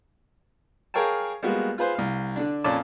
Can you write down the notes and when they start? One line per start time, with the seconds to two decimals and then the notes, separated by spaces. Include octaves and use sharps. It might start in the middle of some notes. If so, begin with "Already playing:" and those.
0.94 G#4 A#4 C#5 F5 G5 A5
1.42 G3 G#3 A#3 B3 F4 F#4
1.78 F4 G#4 B4 C5
1.95 C2 F5
2.36 D3 D4
2.64 F2 A#2 C#4 D5 A5 D6